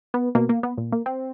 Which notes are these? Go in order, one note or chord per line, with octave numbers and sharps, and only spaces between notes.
B3
B2 A#3
A#3
B3
A#2
A#3
C4